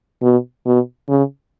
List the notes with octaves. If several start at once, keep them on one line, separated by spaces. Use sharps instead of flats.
B2
B2
C#3